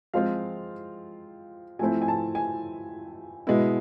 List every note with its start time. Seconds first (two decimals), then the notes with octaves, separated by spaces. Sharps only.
0.14 F3 G#3 C4 F4 F5
1.79 F3 A3 C4 E4 G#5
2.02 G#5
2.08 A5
2.35 G#5
3.47 B2 G#3 B3 E4